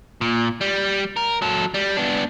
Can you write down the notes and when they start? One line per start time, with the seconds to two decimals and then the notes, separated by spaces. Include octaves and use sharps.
0.21 A#2
0.61 G3
1.16 A#4
1.42 F#3 A4
1.74 G3
1.97 B3 D4